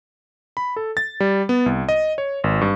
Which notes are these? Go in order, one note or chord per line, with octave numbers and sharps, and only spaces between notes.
B5
A4
A6
G3
B3
C2
D#5
C#5
G#1
G2